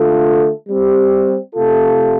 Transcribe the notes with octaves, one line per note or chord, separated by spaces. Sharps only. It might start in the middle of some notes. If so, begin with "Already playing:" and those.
Already playing: D3 A3 F4 A4
G3 C4 G4
C3 A3 F4 A4